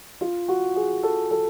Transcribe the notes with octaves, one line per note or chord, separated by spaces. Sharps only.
F4
F#4
G#4
A4
A4